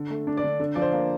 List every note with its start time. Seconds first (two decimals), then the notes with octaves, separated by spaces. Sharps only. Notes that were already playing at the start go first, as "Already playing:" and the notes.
Already playing: D3
0.10 A3
0.27 D4
0.37 D5
0.43 D3
0.60 D3
0.75 F3 D5
0.82 C5
0.93 A#3